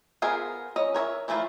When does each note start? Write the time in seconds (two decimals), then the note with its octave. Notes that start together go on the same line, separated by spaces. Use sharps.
0.22 B3 F4 G#4 A#4 C5
0.76 C#4 D#5
0.95 A#4 C#5 D#5 E5
1.28 E3 F3 A3 E4 F4